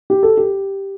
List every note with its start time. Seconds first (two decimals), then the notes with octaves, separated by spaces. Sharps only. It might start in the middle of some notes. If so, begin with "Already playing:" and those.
0.10 G4
0.23 A4
0.37 G4